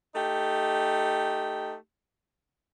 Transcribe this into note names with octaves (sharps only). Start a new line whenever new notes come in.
A3 D#4 G4